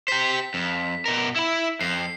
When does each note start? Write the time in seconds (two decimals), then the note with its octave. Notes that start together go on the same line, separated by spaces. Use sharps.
0.08 G4 C5 B6
0.54 F2
1.06 B2 A#4
1.36 E4 B5
1.81 F2 C7